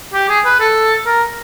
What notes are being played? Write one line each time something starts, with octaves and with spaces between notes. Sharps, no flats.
G4
G#4
B4
A4
A#4